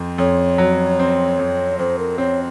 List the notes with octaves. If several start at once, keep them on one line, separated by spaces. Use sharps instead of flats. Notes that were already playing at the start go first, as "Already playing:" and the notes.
Already playing: F2 C4
F2 C#5
F#3
C4
F2
F2 C5
A#4
C4 C#5